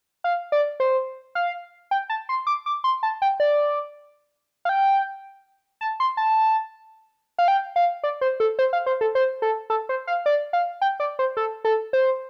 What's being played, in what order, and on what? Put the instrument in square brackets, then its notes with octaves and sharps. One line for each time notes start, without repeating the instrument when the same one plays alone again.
[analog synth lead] F5
D5
C5
F5
G5
A5
C6
D6
D6
C6
A5
G5
D5
F5
G5
A5
C6
A5
F5
G5
F5
D5
C5
A4
C5
F5
C5
A4
C5
A4
A4
C5
F5
D5
F5
G5
D5
C5
A4
A4
C5